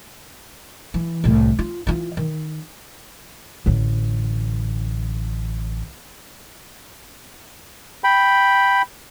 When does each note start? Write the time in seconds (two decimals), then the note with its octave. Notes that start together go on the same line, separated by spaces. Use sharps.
0.94 E3
1.24 C2 A2
1.59 F4
1.87 E3 F4
2.17 D#3
3.66 A1 D3
8.04 G5 B5